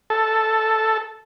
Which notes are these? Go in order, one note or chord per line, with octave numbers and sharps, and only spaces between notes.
A4